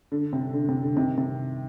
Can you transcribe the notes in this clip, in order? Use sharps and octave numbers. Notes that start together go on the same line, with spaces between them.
D3
C3
D3
C3
D3
C3 D#3
C3